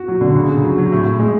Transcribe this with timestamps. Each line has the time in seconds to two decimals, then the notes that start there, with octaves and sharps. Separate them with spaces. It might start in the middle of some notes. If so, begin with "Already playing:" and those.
Already playing: F#4
0.08 F#3
0.21 D3
0.35 C#3
0.49 C#3
0.63 F#3
0.78 F#3
0.92 A2
1.06 A2
1.20 G#3